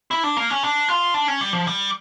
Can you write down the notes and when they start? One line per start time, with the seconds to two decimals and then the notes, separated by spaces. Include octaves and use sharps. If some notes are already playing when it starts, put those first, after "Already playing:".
0.11 E4
0.24 D4
0.37 A#3
0.50 C#4
0.63 D4
0.89 F4
1.14 D4
1.28 C#4
1.41 G3
1.53 F3
1.67 G3